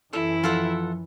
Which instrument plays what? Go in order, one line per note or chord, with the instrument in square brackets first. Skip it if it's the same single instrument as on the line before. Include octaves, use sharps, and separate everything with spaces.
[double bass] F#2 E3 [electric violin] E4 [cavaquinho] A4
[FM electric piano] F3 [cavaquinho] F4 A4 F#5